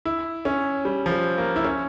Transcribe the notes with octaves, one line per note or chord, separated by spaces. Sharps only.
E4
C#4
G3
F3
G3
A#3
E4
C#4